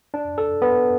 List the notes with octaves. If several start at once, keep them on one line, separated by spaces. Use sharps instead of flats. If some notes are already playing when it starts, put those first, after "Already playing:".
D4
A4
B3